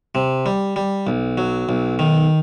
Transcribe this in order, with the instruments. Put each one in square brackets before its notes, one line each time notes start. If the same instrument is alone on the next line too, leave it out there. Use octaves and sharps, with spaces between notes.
[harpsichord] C3
G3
G3
B1
F#3
B1
D#3